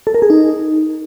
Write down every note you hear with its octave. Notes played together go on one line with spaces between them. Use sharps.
A4
A#4
G#4
D#4